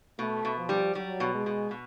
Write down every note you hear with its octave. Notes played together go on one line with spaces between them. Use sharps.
B2 A3
B2
F3
G3
F#3 G3
B2
G#3
B2
B2